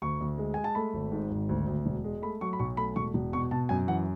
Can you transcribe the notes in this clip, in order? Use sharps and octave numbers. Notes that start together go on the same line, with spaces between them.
D2 C#6
D2
G#3
G#3 G#5
A5
A3 B5
G#1
G#2
G#1
D2
D2
E1
G#3
A3 B5
F#3 C#6
B5
B1 C#6
A3 B5
E1 C#6
E1
B2 C#6
B2 A5
F#2 G#5
E3 F#5